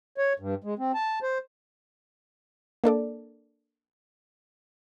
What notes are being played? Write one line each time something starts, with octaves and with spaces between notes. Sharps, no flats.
C#5
G2
G#3
C4
A5
C5
A#3 D4 A4 D5